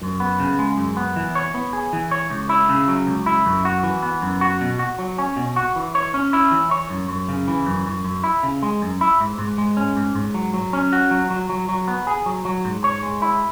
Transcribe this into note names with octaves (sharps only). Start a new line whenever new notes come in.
F#2
B3
C#3
G#3
F#2
B3
E3
C#5
B3
G#4
E3
C#5
C#2
E4
C#3
F#3
C#2
E4
F#2
F#4
E3
B3
F#2
F#4
B2
F#4
F#3
C#4
B2
F#4
E3
C#5
C#4
E4
E3
C#5
F#2
F#2
C#3
E3
F#2
F#2
F#2
E4
C#3
G#3
F#2
E4
G#2
G#2
G#3
C#4
G#2
G#2
F#3
F#3
C#4
F#4
F#3
F#3
F#3
F#3
B3
G#4
F#3
F#3
G#2
C#5
G#3
E4